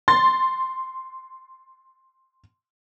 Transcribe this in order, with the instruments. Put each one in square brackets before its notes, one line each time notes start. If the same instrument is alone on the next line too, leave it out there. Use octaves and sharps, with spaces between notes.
[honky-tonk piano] C6 A6